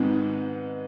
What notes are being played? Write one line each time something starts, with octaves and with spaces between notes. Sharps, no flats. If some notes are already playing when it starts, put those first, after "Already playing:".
Already playing: G#2 D#3 G#3 B3 C4